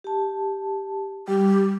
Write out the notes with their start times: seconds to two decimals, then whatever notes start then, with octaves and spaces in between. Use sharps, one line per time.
0.04 G4 A5
1.28 G3 G4